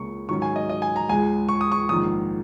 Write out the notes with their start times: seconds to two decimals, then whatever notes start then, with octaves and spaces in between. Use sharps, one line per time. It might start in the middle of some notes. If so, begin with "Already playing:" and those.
Already playing: C#2 C#3 A#3 C#6
0.29 G#2 D#3 F#3 C#4 C#6
0.42 G#5
0.56 D#5
0.69 D#5
0.82 G#5
0.96 A#5
1.09 C#2 C#3 G#3 G#5
1.48 C#6
1.61 D#6
1.72 C#6
1.89 A#1 G#2 D#3 D#6